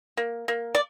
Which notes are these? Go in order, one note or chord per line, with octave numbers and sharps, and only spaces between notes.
A#3
A#3
D5